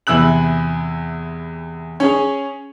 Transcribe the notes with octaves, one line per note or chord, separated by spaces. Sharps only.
E2 C3 E3 E6 F#6 F#7
C#4 G#4 C#5